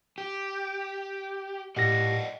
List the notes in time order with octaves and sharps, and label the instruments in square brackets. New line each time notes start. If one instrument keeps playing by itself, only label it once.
[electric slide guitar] G4
[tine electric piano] A2 G4 A#6 [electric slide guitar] D5 D#5 F#5